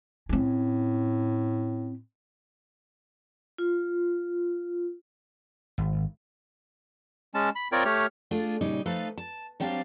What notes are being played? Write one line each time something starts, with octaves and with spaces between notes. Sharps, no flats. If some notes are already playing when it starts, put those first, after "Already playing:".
A2 C4 C#4
F4
G#1
G#3 C#4 A5
B5
C4 F4 A#4 C#5 D5 G5
A3 G4 C#5 F6
A3 D4 F4 G#4
A#2 C#3 G3 D#4
F3 A3 D#4 A4 B4 F5
A5
F#3 G3 C4 D4 G4 F5